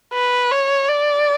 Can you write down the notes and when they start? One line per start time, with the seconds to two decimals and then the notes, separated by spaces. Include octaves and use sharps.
0.14 B4
0.52 C#5
0.89 D5